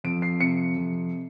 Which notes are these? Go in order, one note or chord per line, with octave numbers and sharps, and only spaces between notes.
F2 D7
C7
C3 C#7
F2